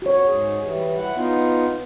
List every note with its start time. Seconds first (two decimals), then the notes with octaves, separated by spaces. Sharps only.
0.02 F#4 C#5
0.26 G#2 G#4
0.64 E3 G3
0.96 E4 F#5
1.16 B3 D#4 F4